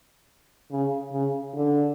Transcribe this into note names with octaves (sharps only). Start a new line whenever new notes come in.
C#3
C#3
D3